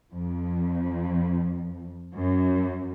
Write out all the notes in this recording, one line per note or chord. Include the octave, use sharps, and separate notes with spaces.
F2
F#2